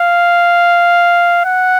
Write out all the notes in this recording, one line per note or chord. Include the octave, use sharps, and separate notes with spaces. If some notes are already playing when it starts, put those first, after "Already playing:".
Already playing: F5
F#5